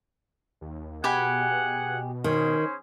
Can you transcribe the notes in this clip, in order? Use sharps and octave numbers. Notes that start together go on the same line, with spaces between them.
D#2
B2 G4 G#4 F#5 G#5 B5
D#3 C#4 G#4 C5